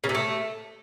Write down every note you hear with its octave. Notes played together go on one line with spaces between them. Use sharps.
C#3
C3
A3